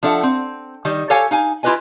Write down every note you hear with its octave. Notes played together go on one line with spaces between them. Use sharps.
F3 D4 A4 E5 F#5
C4
D#3 G3 D#5
G4 A4 C#5 F5 G#5
D#4 F5 G#5
E4 F4 G4 B4 D#5 G#5